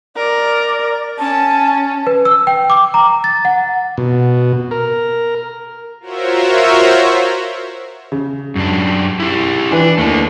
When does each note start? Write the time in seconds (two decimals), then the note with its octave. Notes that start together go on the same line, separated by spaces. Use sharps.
0.16 A#4 D5
1.19 C#4 A5
2.07 B4
2.25 E6
2.47 G5
2.70 D6
2.94 A#5
3.24 A6
3.45 F#5
3.98 B2
4.71 A#4
6.00 F4 F#4 A#4 C5 C#5 E5
8.12 C#3
8.56 F#2 D4
9.20 E4 G4
9.71 E3 D4 B4
9.98 D#2 A3 D4